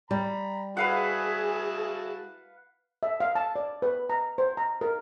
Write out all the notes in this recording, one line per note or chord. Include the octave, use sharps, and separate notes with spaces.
G3 A#5 B5
E4 F#4 G#4 B4 F5 F#5 A5
E5
F5
A5
D5
B4
A#5
C5
A#5
A#4